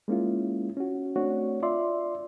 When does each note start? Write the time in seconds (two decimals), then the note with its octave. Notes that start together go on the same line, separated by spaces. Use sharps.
0.08 G#3 A#3 C#4 E4 F4
0.77 C#4 F#4
1.16 A3 C4 D4 F#4 C#5
1.63 F4 D5 E5 C6